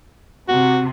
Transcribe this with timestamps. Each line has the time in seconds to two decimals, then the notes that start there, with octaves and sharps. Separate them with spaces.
0.49 C3 F#4